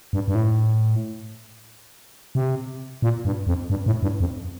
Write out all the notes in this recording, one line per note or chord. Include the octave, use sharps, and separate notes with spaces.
G2
G2
A2
C3
A#2
G2
F2
G2
A2
G2
F2